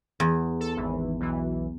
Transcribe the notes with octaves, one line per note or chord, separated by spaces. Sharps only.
E2
A4
G#1 E3
B1 E3